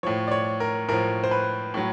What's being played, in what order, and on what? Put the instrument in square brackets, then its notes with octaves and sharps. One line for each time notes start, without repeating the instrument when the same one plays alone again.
[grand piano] A2 F3 C#5
D5
C#5
A#4
A2 F3 A#4
C5
B4
A2 F#3